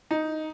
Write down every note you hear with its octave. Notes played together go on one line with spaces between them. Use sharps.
D#4